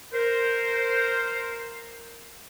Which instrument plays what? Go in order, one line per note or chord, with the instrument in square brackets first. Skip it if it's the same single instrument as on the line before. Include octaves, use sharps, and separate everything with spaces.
[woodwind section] A#4 C5